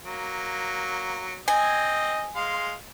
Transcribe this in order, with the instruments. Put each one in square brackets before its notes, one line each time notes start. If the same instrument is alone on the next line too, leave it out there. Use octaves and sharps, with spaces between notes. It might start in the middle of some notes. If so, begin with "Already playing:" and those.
[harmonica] F#3 A#3
[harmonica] C4 D#5 [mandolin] G#5
[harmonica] G#3 F5 C6